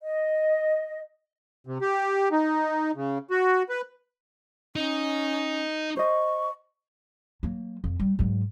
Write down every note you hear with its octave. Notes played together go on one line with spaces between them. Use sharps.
D#5
C3
G4
D#4
C#3
F#4
B4
C#4 D#4
C5 D#5 C#6
F#3 A#3
F2
G3
G#2 F#3